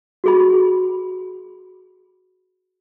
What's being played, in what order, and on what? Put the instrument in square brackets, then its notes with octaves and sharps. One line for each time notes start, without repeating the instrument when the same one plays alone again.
[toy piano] F#4 G#4 B5